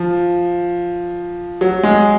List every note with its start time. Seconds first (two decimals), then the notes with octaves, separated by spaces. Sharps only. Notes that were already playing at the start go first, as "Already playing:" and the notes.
Already playing: F3
1.61 F#3
1.83 G#3